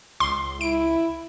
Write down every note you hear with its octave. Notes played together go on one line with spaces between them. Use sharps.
C#2 C6
E4 D7